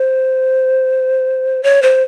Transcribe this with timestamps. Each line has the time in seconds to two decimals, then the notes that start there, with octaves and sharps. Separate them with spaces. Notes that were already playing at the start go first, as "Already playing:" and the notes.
Already playing: C5
1.63 C#5
1.82 C5